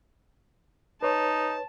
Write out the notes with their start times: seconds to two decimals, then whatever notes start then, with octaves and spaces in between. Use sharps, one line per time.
1.02 D#4 B4 C#5 A5